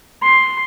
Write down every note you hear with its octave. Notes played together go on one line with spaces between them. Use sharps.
C6